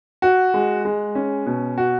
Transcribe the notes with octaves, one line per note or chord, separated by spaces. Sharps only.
F#4
G#3
G#3
C#4
B2
F#4